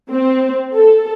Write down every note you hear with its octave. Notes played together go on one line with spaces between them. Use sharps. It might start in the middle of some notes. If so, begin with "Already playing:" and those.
C4
A4